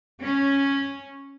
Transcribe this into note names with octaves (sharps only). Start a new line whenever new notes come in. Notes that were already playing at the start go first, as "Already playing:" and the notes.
C#4